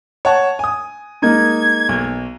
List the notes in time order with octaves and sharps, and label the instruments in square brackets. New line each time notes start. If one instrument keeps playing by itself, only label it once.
[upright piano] C#5 F#5 A5
G#5 D#6
[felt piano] G#3 A#3 D#4 [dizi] G#6
[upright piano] B1